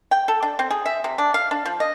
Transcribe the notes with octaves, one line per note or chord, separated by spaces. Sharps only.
G5
A4
D4
C4
G#4
E5
C3
D4
F5
D4
F3
D#5